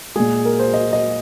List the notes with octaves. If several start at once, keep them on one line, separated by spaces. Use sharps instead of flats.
A#2 G#3 G#4
A#4
C5
D#5
D#5